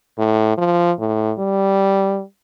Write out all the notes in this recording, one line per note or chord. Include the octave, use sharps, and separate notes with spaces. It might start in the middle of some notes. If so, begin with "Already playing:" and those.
A2
F3
A2
G3